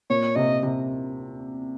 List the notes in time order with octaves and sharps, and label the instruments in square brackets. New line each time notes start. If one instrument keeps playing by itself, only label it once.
[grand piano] A#2 [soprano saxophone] C#5
[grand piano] C3 [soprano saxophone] D#5
[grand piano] C3